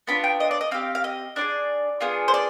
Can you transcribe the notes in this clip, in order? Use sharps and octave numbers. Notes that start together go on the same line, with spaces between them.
B3 D4 F4 B5
G5
D#5
D5
D#5
C4 G4 F5
F5
D#5
D4 F4 G#4 D5
B3 D4 F4 G#4
C5
D5